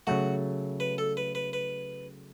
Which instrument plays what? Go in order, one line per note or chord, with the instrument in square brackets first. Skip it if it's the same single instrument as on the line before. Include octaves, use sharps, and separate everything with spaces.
[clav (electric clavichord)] C#3 F#3 A3 [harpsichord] F#4
[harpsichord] B4
A4
B4
B4
B4